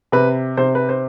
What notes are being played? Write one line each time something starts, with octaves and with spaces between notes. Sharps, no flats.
C3 B4
C3 C5
B4
C5